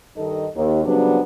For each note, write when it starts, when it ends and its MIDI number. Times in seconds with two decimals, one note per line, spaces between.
0.17 0.48 43
0.17 0.48 51
0.17 0.48 63
0.17 0.48 69
0.17 0.48 75
0.55 0.84 39
0.84 1.20 49
0.84 1.20 54
0.84 1.20 55
0.84 1.20 59
0.84 1.20 60
0.84 1.20 62